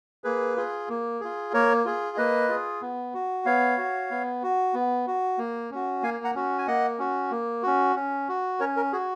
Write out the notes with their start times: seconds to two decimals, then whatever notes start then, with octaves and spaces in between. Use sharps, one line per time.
0.24 A#3 G#4 B4
0.57 F4 G#4
0.89 A#3
1.20 F4 G#4
1.53 A#3 A#4 C#5
1.85 F4 G#4
2.17 A#3 B4 D#5
2.49 F4 G#4
2.82 B3
3.14 F#4
3.45 B3 C#5 F5
3.78 F#4
4.11 B3
4.43 F#4
4.74 B3
5.07 F#4
5.38 A#3
5.71 C#4 F#4
6.02 A#3 F5 G#5
6.24 F#5 A#5
6.35 C#4 F#4
6.58 G#5
6.67 A#3 D#5 F#5
6.99 C#4 F#4
7.31 A#3
7.63 C#4 F#4
7.96 C#4
8.28 F#4
8.60 C#4 A#4 C#5
8.77 A#4
8.92 F#4 G#4